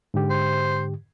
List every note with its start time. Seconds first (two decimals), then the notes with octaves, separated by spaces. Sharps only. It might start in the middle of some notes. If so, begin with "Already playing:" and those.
0.14 G#2 D3 G4
0.30 C5